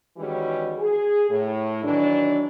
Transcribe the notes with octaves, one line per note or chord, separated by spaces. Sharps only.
D#3 E3 G3 G#3 C#4 F#4
G#4
A2
D#3 E3 F#3 D4